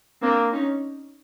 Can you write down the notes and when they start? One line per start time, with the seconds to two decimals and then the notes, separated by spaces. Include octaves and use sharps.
0.22 A#3 C4 D4
0.52 C#4 D#4